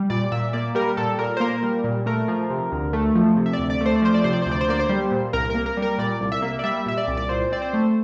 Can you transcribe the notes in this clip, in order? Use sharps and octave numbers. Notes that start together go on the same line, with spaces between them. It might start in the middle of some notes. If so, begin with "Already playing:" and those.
Already playing: G3
A#2 D5
A#2 E5
A#3 D5
G3 A#4
A#2 A4
A#2 A#4
C5
A#3 A#4
G3
A#2
A3 A#4
F3
C3
D2
A3
F3
C3
E5
D5
D2
D5
A3 C5
D5
F3 C5
D5
C3 C5
D5
D2 C5
D5
C5
A#3 D5
C5
G3
A#2
C2 A#4
A#3 A#4
A#4
G3
A#4
A#2 D5
C2
E5
A#3
D5
G3 E5
A#2 E5
D5
C2
D5
A#2 C5
C4 D5
C5
A3